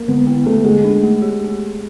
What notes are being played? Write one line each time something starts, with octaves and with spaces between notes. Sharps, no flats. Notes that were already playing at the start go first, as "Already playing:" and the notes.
Already playing: A#3
D3 B3
A#3
D3 A3
G#3 A3
D4
A3
G4